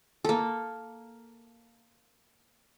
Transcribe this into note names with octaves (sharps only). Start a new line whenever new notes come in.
A#3 A4